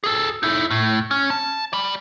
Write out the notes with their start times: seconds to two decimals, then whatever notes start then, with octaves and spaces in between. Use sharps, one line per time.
0.04 G#4 A4
0.43 D#4 E4
0.71 A2
1.11 C#4
1.30 A5
1.73 D5 B5